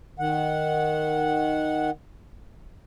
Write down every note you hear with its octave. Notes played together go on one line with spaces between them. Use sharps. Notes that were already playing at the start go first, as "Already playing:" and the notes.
D#3 F#5